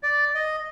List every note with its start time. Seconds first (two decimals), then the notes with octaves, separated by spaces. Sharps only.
0.03 D5
0.35 D#5